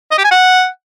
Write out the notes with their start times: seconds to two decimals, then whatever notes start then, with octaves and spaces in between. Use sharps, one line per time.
0.12 D#5
0.18 G4
0.24 G#5
0.31 F#5